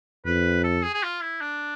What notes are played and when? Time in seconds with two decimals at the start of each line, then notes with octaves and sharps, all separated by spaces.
0.26 F2 B4
0.64 A4
0.83 G#4
0.94 G#4
1.03 F4
1.22 E4
1.41 D4